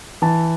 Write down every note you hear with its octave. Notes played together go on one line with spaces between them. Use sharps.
E3 A5